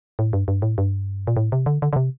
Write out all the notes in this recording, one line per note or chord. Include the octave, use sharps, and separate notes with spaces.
A2
G2
G2
A2
G2
A#2
A2
C3
D3
D3
D3
C3